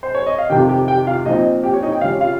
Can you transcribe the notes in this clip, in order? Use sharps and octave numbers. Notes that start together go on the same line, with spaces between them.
C5
C#5
D#5
F5
F2 C3 D#3 G4 G5
G4 G5
G4 G5
F4 F5
A#2 F3 C4 D#4 D#5
G4 G5
C#5
D#4 D#5
G5
C#3 G3 C#4 F4 F5
F4 F5